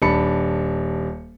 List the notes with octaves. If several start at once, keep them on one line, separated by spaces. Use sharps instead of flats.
D#1 D4 A5 B5 C#7